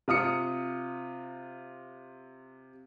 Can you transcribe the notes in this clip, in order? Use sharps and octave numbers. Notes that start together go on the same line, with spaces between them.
C3 F4 D#6 C#7